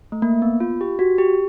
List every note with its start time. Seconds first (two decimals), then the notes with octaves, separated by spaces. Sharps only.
0.12 A3
0.22 A#3
0.42 B3
0.60 F4
0.81 G4
0.99 F#4
1.18 G4